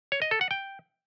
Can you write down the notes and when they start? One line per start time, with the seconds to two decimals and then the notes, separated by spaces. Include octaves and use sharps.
0.12 C#5
0.22 D#5
0.31 A4
0.41 F#5
0.51 G5